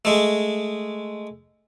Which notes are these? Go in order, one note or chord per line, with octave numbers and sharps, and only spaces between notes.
G#3 A3